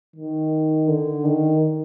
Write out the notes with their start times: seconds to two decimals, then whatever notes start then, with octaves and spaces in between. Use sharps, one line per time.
0.16 D#3
0.88 D3
1.25 D#3